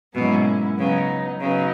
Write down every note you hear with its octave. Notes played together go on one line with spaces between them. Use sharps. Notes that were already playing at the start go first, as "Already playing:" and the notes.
G#2 B2 F#3 A#3 C#4 E4
C#3 F#3 B3 D#4
C#3 F#3 B3 D#4